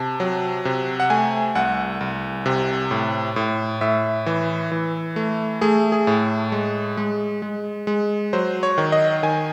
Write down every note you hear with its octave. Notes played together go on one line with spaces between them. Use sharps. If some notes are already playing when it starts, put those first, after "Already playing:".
Already playing: C3 A5
F#3
C3
F#5
A3 G#5
C2 F#5
C2
C3
A2
A2
A2 E5
E3
E3
A3
A3 G#4
G#4
A2
G#3
G#3
G#3
G#3
F#3 C5
C#5
D#3
D#5
D#3 G#5